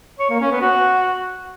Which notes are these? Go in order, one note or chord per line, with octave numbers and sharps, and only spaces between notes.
C#5
A#3
C#4
B3
F#4